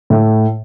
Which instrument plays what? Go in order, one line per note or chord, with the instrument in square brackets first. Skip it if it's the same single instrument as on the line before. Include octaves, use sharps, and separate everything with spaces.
[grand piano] A2